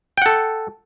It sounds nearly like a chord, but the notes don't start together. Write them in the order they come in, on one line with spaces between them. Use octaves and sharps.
G5 F#5 A4